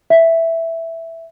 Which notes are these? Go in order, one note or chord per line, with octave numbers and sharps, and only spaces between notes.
E5